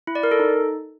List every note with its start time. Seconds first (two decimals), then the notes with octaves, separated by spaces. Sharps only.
0.07 E4
0.15 D5
0.23 A#4
0.31 A4
0.39 D#4